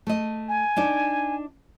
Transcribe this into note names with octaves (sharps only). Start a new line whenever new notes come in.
A3 D#5
G#5
D4 D#4 D5